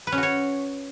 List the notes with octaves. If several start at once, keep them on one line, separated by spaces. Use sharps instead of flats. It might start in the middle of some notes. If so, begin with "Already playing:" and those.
B4
C#4
F#4
C#5